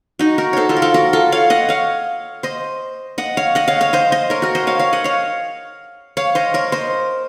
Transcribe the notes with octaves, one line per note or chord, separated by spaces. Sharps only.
D#4 F#4
F#4 A#4
A4 C5 C#5
F4 A4
A#4
F4 A4
F#4 A#4
F4 A4
C#5 F5
D#5 F#5
C#5 F5
C5 D#5
D#5 F#5
C#5 F5
D#5 F#5
C#5 F5
C#5 F5
C5 D#5
C5 D#5
A#4 C#5
F#4 A#4
C5 D#5
C#5 F5
C#5 F5
D#5 F#5
C#5 F5
C#5 F5
C5 D#5
A#4 C#5
C5 D#5